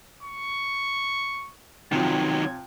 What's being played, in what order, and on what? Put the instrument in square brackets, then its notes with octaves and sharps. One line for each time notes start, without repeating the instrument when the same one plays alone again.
[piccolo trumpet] C#6
[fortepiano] C3 F3 [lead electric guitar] D#3 F#3 [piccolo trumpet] G#6